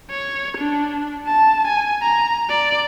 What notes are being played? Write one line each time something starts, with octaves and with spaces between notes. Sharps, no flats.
C#5
D4
A5
G#5
A#5
D5